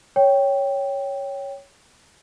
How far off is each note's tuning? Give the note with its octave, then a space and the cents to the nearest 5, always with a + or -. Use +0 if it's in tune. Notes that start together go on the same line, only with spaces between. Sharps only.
C#5 +0 G5 +0